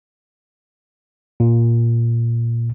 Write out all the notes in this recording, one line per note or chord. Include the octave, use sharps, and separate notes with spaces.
A#2